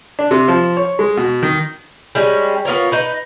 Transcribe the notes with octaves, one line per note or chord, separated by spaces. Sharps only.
D4
C3
F3
C#5
G#3
B2
D#3
G3 G#3 C#4
B3 F4 A#4 C#5
D#4 B4